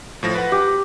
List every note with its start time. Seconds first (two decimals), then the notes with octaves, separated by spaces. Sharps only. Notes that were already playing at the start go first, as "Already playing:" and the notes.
0.23 A2 F3 A#6
0.35 B4 F#5
0.52 G4